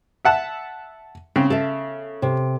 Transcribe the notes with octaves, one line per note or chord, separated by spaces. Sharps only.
E5 F#5 A5
C#3 C4
A4 E5
C3